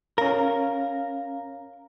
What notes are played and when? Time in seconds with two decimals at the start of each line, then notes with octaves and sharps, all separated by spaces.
0.18 C#4 A#4 F5